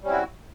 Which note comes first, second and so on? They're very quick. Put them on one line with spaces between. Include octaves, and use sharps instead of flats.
G3 C#4 C4 E4 F#4